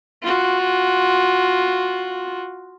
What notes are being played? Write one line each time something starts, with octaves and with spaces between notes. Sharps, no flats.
F4 F#4